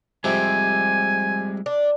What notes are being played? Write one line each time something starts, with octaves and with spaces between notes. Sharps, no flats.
F2 C3 G3 G#3 G#5
D4